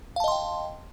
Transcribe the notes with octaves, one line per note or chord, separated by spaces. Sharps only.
D#5 F5 G5 A5 C6